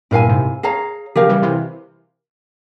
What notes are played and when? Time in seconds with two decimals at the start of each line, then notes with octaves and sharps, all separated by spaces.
0.11 G2 A#2 E4 A#4 F5 G#5
0.28 G#2 C3
0.63 G#4 C#5 F5 A#5
1.16 C#3 F3 G4 A#4 F5
1.29 E3 G3
1.42 C3 E3